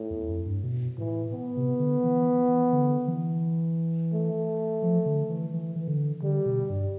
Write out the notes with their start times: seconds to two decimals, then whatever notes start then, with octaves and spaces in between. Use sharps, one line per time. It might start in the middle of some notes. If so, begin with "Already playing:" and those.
Already playing: A2
0.10 E2
0.28 F2
0.46 G2
0.63 B2
0.98 A2 E3
1.32 B3
1.57 C3
1.79 D3
2.03 E3
2.38 E3
2.72 D3
3.08 E3
4.13 A3
4.82 F3
5.06 D3
5.30 E3
5.53 E3
5.76 E3
5.88 D3
6.23 D3 G3
6.46 B2
6.70 G2